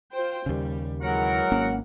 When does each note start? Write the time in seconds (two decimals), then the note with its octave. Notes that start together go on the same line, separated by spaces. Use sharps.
0.12 F4 C5 G5
0.46 D#2 C#3 G3
1.02 E3 F#3 G#3 A#4 F#5
1.52 G#1 A#3 C#4